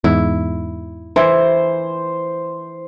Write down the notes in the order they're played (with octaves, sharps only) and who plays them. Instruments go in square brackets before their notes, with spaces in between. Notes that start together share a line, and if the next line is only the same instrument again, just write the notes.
[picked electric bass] E2 G#2 [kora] E4
[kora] E3 E4 [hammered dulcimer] C5